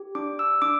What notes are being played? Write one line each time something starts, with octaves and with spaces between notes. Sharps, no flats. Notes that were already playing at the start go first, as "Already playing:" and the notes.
Already playing: G4
D4 D6
E6
D4 D6